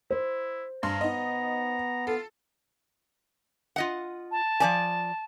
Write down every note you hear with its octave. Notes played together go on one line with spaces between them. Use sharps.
E4 C5
G2 A#5 C6
B3 D#4 D#5
F4 A4
F4 D#5 F#5
A5
F3 D5 G#5